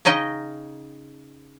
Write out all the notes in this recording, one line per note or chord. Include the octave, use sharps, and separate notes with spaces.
C#3 C#4 D#4 D#5 G5